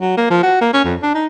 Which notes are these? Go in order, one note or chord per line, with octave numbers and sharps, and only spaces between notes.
F#3
A#3
F3
F#4
A#3
C#4
F2
D4
D#4